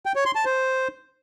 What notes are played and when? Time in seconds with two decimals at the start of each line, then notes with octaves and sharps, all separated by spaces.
0.06 G5
0.15 C#5
0.25 C6
0.35 A5
0.45 C5